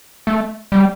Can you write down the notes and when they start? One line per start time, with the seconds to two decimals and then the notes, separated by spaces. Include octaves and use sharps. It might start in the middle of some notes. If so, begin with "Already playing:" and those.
0.27 A3
0.72 G3